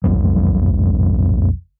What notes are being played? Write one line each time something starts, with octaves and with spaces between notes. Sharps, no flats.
F#1 B1 F2 F#3